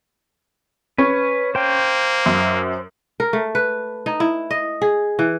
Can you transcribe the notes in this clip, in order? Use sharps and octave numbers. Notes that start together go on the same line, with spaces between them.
C#4 B4
A#3 C5 G5
F#2
A#4
A3
B4
D#4
E4
D#5
G#4
E3